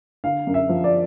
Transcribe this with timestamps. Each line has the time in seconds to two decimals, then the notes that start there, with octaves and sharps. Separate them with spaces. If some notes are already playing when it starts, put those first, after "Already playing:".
0.24 D3 F5
0.47 F#2
0.54 E5
0.69 F3
0.84 D5